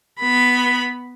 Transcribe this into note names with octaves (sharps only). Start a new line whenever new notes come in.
B3 B5